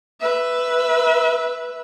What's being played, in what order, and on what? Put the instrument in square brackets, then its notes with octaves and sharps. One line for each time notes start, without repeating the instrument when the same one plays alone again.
[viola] B4 E5